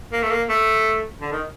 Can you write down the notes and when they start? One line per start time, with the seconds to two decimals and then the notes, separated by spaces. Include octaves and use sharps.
0.13 A#3
0.23 A3
0.30 A#3
0.49 A3
1.21 D3
1.32 D#3